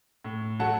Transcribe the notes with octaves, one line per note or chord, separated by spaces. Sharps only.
A2
F#3 A3 F#5 A5